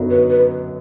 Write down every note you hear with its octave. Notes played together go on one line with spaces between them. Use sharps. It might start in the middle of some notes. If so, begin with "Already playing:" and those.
Already playing: F#2 D3 F#3 B3 D#4
B4
B4